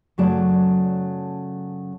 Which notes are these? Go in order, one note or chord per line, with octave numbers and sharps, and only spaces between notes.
F#2 C#3 F#3 A3 D5 A5